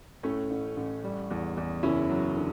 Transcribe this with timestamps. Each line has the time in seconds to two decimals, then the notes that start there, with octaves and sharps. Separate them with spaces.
0.23 A2 A3 C#4
0.50 A1
0.77 A1
1.04 G3
1.30 E2
1.57 E2
1.83 F#1 C#4 E4
2.10 F#3
2.36 D3